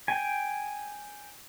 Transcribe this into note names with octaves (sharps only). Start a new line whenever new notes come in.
G5 G#5